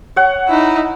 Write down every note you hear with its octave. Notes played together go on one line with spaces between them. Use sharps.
C#5 F#5
D#4 E4